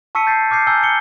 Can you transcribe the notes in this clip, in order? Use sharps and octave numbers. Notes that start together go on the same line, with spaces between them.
A5 C#6 E6 B6 C#7 D#7
G6 A6 B6 C7
C#6 D6 F6 G6 C7 C#7
G#5 A#5 E6 F6 G6 G7
C#7 G7